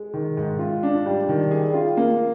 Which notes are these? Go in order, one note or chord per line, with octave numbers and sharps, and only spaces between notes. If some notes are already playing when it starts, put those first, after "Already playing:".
Already playing: G#3
D#3
G#2
F4
D4
G3
D#3
G#4
F4
A#3